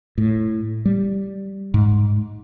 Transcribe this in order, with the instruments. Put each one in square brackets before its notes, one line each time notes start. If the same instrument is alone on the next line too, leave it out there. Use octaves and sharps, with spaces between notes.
[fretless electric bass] A2
G3
G#2